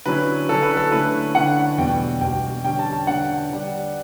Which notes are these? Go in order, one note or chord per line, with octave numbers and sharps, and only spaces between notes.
D3 F#3 C#4 E4 B4
D3 F#3 C#4 E4 A4
B4
A4
D3 A3 C#4 E4 B4
D3 A3 C#4 E4 F#5
E2 B2 G3 G5
E2 B2 G3 G5
D3 G3 C#4 G5
A5
A5
D3 G3 C#4 F#5
D3 G3 D4